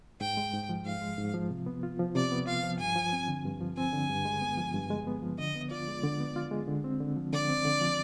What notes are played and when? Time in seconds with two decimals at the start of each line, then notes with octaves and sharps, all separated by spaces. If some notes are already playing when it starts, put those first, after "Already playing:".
0.21 G#2 G5
0.37 G#3
0.53 G#2
0.69 F3
0.85 G#2 F5
1.01 G#3
1.18 G#2
1.34 F3
1.50 C3
1.66 B3
1.83 F4
1.99 F3
2.15 C3 D5
2.32 B3
2.47 F4 F5
2.63 F3
2.80 G2 G#5
2.96 F3
3.13 C4
3.28 D3
3.45 G2
3.60 F3
3.77 C4 G#5
3.93 D3
4.09 G2
4.25 G#3
4.42 B3
4.57 F3
4.74 G2
4.90 G#3
5.07 B3
5.22 F3
5.38 D3 D#5
5.55 B3
5.71 F4 D5
5.88 G#3
6.03 D3
6.20 B3
6.36 F4
6.51 G#3
6.68 D3
6.84 C4
7.00 D3
7.17 F3
7.33 D3 D5
7.49 C4
7.65 D3
7.81 F3